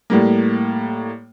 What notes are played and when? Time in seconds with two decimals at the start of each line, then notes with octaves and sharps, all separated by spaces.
0.10 A2 G3 A#3